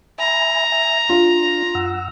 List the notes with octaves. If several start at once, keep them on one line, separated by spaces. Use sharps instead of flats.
E5 G#5 A#5 B5
E5 G#5
D4 F4
F#2 F#5 E6